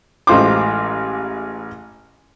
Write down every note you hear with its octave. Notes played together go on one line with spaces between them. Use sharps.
A1 G#3 F4 C5 D6